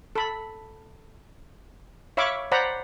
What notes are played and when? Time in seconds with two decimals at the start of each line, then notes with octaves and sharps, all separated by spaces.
0.16 A4 B5
2.17 C#5 E5 F5 B5 C#6 D6
2.52 C5 D5 F#5 A#5 B5